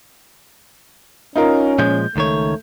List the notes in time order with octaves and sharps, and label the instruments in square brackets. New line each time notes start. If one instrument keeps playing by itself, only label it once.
[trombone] C#4 [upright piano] D#4 F4 A#4
[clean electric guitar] A#2 F3 G#3 [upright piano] G6
[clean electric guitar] C#2 D#3 C#5 [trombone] A3